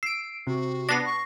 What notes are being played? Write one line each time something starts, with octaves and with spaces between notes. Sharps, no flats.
E6 C7 D7
C3 F#4
B3 D4 A#6 C7
C#6